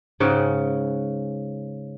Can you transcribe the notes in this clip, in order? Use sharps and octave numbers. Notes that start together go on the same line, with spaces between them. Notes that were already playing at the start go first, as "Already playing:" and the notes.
G#2 C#3 F#5 G5